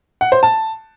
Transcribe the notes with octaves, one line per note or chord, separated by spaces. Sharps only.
F#5
C5
A5